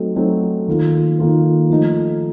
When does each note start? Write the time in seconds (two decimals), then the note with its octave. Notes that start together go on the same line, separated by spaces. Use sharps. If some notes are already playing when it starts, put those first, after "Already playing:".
Already playing: F#3 A3 C4 D#4 F#4
0.16 F#3 A3 C4 D#4 F#4
0.67 D#3 A#3 F4 A4
1.19 D#3 A#3 F4 A4
1.70 F3 A3 D#4 A4